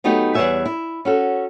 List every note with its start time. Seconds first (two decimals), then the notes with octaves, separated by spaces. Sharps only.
0.04 F#3 A3 B3 D#4 G4
0.34 E2 G3 B4 C#5 E5 G#5
0.66 E4
1.05 C#4 F#4 A4